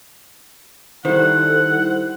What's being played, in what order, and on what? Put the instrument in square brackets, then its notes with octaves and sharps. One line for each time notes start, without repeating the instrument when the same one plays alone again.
[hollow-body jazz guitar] D#3 [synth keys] G3 E4 C5 [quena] A4 [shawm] F#5